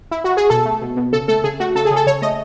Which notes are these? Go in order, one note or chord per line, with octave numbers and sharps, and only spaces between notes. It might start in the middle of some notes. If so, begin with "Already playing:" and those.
E4
F#4
G#4
B2 A4
A3
B2
B2
C#3 A4
A3 A4
C#3 G#4
A3 F#4
C#3 A4
G#4
C#3
A4
C#3 C#5
A3 D#5